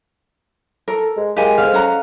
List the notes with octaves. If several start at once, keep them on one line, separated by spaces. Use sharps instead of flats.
A4 A#4
G#3
G#3 G4 A#4 F5 G#5
A4 C5 F5
C#4 F#5 A#5